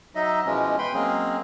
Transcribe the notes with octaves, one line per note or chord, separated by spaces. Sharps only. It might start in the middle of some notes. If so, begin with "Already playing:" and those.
F#3 D#4 D#5 E5
B2 E3 F3 G#3 C#4
B4 G5 B5 C6
F#3 G#3 A#3 C4 C#4 G#4